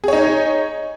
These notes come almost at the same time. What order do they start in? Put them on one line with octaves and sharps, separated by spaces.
G#4 C#5 D#4